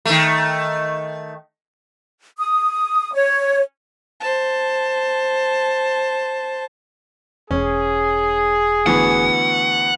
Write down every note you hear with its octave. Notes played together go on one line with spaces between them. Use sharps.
D#3 A3
D#6
C#5
C5 A5
E1 C#4 G#4
D2 E3 B3 F#5